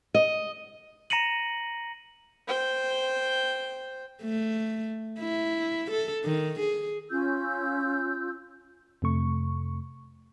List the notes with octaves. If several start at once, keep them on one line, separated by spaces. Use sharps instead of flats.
D#5
A#5 A#6 C#7 D#7 F#7
C5 G5
A3
E4
A4
D#3
G#4
C#4 F4 E6 G6
F2 C3 A3 C#6